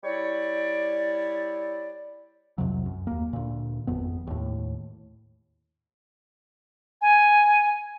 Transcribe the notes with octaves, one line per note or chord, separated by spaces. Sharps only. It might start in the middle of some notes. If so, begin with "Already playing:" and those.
G3 E4 C#5 D5
C2 F2 C3 F#3
F#2
D#2 A#3
D2 A#2
G#1 F2 B3
D#2 A2
G#5